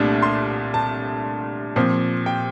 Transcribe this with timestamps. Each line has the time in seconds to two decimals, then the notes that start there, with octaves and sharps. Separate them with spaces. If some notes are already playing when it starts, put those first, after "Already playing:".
Already playing: C2 A#2 A3 D4
0.22 C6
0.74 A5
1.76 A#2 F3 C4
2.26 G5